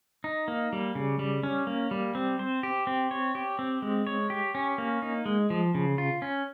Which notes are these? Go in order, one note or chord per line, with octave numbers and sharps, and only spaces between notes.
D#4
A#3
G3
C#3
G3
C#4
A#3
G3
C4
C5
G4
C4
C#5
G4
C4
G#3
C#5
G4
C#4
A#3
D#4
G#3
F3
C#3
F4
C#4